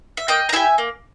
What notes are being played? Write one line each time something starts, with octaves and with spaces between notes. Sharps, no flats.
E5
A#3 D#5 G5
A#5
E4 G4 E5 G#5
A#3